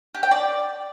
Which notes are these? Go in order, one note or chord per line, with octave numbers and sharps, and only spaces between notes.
G4
G5
D5